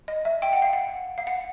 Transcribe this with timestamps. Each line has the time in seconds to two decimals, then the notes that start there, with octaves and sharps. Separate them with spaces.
0.08 D#5
0.25 E5
0.42 G5
0.53 F#5
0.62 F5
0.73 F#5
1.18 F5
1.27 F#5